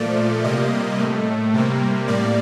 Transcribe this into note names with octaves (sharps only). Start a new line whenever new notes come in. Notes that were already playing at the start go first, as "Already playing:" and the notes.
Already playing: A#2 F3 A3 D5
C3 G3 A#3 D#5
A2 A3
C3 G3 A#3
A2 G3 A#3 D5